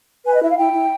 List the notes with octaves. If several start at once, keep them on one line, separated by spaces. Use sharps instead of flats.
B4 G#5
D#5
E4 E5
F5
E4 G5
E4